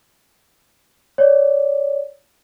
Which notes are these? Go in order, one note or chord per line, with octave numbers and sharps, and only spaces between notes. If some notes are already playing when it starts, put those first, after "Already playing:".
C#5 D5